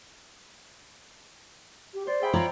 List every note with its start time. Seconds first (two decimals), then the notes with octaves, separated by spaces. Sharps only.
1.94 G4
2.07 C5 D5
2.22 G#4 E5 G5 B5
2.34 F4 C#5 D5 A#5